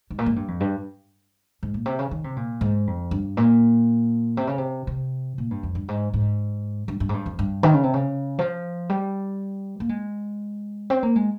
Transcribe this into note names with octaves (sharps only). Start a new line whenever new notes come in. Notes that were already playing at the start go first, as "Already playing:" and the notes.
G#2
A#2
G#2
G2
F2
G2
G#2
A#2
C3
C#3
D#3
C3
A#2
G#2
F2
G2
A#2
C3
C#3
C3
C3
A#2
G2
F2
G2
G#2
G#2
G2
G2
G#2
G2
F2
G2
D#3
C#3
C3
C#3
F3
G3
A#3
G#3
C4
A#3
G#3